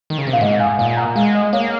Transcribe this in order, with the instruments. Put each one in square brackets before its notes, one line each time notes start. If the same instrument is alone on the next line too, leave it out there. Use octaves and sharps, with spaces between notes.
[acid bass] D#3
C#3
C3
[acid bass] A#2 [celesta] F5
[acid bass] G#2 [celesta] D#5 F#5
[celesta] F#5
F5 G#5
[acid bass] A#2 [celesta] F5 G#5
[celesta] F#5 A#5
[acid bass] G#3 [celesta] F5 G#5
[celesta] D#5 F#5
[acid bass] A#3 [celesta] C#5 F5